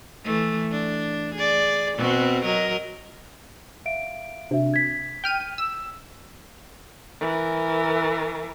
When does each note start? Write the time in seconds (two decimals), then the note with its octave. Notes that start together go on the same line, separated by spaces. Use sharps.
0.25 E3 A3
0.71 D4
1.35 G#4 D5
1.96 B2 C4 F#4
2.45 F#3 A#4 D#5
3.86 E5 F5 D7
4.51 C3 D4 F#4 E5
4.74 G#6 B6
5.24 G5 F6 D#7
5.58 E6
7.20 E3 A#4